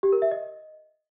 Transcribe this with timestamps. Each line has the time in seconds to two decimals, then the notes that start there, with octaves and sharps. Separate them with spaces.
0.03 G4
0.13 A#4
0.22 E5
0.31 D#5